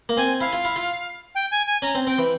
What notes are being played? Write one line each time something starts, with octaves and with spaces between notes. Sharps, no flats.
A#3
C4 G#5
E4 F5
F4
E4
F4
G5
G#5
G#5
C#4 A#5
C4
C4 G5
E3